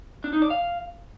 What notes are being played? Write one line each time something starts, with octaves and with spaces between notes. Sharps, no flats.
D4
D#4
D5
F5